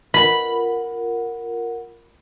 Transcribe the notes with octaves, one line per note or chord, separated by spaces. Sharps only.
F4 A#4 F#5 B5